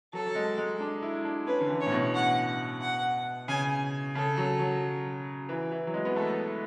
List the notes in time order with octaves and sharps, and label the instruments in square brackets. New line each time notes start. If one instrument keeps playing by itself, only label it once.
[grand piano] F#3 [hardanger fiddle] A4
[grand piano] F#3
G#3
G#3
D4
E4
D4
[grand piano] C#4 [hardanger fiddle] B4
[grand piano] D3
E3
[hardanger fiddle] C#5
[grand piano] A2
B2
[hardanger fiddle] F#5
F#5
[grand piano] C#3 [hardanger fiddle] G#5
[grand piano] C#3 [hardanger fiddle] A4
[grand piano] F#3
F#3
E3
E3
F#3
G#3
B3
[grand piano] A3 [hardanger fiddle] A4